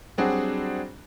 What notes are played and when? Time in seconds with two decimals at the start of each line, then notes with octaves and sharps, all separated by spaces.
0.18 F#3 G3 C4 D4 F#4 G#4